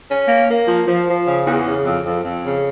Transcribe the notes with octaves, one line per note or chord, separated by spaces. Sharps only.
C#4
A#3
A#3
F3
F3
F3
C#3
E2
C#3
F2
F2
F2
C#3